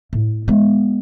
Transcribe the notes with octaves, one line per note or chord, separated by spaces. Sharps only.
A2
G#3 B3